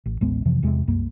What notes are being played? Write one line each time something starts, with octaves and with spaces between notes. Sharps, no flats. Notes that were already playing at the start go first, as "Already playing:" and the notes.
A1
A1 D#2 G#3 B3
F2 C3 E3 F3
E2 C3 G#3
C2 F#2 A#3